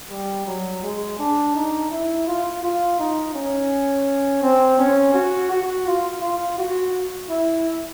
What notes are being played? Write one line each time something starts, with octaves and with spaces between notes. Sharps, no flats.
G3
F#3
G#3
D4
D#4
E4
F4
F4
D#4
C#4
C4
C#4
F#4
F#4
F4
F4
F#4
E4